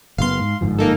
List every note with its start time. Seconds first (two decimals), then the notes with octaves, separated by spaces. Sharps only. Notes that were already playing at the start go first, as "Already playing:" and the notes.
0.18 F#1 B2 B3 F5 C6
0.39 G#2
0.61 G1 G#2 F3
0.79 A#3 D#4 A4